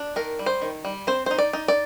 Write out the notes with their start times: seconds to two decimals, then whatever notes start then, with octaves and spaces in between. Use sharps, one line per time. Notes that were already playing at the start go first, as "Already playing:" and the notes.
Already playing: D4
0.16 D#3 A#4
0.39 G3
0.46 C5
0.62 D#3
0.85 G3
1.07 C4 C5
1.26 D#4 C5
1.38 D5
1.53 D#4
1.68 D5